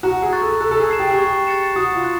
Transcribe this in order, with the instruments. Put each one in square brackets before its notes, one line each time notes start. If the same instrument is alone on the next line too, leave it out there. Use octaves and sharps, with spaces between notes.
[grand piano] F#4 [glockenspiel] A#5
[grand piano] G#4
[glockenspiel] C#6 F#6 A6
[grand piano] A4
[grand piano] A4 [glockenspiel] F#6
[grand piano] A4
G#4
[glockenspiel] A6 C7 E7
[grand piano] G4
G#4
[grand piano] G4 [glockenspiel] C#6
[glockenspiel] F#6 A6 C#7 E7
[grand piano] F#4 [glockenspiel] D#6
[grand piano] F4
[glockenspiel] F#6